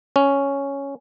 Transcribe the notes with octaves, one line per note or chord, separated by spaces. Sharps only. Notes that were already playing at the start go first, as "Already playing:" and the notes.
C#4